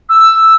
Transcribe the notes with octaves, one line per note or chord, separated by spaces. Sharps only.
E6